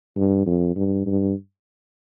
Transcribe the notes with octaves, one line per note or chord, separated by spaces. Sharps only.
G2
F2
G2
G2